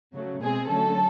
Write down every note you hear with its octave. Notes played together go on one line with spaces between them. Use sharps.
C#3 F#3 A3
B2 G#3 C4 G#4
D3 F#3 A3 C#4 A4